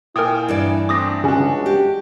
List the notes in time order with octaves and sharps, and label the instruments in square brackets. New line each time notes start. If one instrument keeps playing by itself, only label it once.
[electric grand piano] A#2 G5 G#5 [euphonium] E4 [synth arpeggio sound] A#4 D#6
[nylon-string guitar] G2 E3 D5
[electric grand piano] A3 C4 D4 [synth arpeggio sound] D6 D#6 A#6
[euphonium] C#2 [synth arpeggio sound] C#3 C#4 [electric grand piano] D4 F#4
[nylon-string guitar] G4